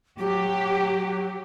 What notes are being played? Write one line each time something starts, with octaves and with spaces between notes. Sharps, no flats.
F#3 G4